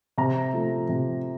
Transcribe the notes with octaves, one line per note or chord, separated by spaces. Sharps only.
C3 A#5
F3 A3
C3